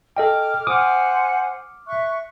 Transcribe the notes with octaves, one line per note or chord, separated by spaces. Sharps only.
A4 D#5 G5 D6 F6
C5 F#5 G#5 D6 D#6 F6
E5 C#6 F#6